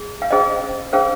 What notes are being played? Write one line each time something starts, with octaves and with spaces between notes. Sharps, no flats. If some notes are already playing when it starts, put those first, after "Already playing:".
Already playing: G#4
F5
C#4 G#4 C5 D#5
C#4 G#4 C5 F5